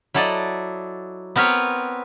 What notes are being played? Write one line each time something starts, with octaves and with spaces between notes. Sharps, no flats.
F#3 E4 A4 D5 D#5
B3 C4 A#4 B4 C#5